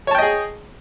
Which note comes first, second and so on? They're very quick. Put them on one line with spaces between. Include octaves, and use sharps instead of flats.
C#5 A5 G5 D#5 G#4